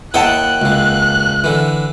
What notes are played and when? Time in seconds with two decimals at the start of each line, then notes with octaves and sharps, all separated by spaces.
0.14 D#2 E4 D#5 F#5 G5 A5 F#6
0.62 C#2 C#3
1.44 D3 E3